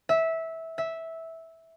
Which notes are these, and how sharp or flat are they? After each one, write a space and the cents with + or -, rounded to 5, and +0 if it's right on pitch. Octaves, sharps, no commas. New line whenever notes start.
E5 -15
E5 -10